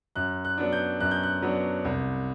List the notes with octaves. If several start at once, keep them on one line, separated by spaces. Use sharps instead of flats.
F#2 F#6
F#6
F#3 B3 D4
G6
F#2 F#6
G6
F#6
F#3 B3 D4
C2